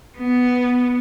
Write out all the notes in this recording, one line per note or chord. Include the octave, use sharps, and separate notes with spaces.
B3